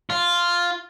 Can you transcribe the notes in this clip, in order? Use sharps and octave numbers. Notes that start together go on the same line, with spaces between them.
F4